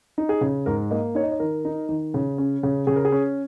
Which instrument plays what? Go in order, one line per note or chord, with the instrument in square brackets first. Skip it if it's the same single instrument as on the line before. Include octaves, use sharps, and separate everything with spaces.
[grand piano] D#4
G#4
C#3
G#2 A#4
A#3 D#5
D#4 C#5
D#5
C#5
D#3 A#4
D#4
D#3
C#3
C#4
C#3
C#3 G#4
A#4
G#4
C#4